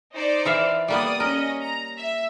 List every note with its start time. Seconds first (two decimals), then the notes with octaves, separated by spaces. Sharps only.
0.14 D#4 C5 D5
0.45 E3 E5 F5
0.88 G3 A#3 B3 D5 D#6
1.20 C#4 A#4 D#5
1.61 A#5
1.98 E5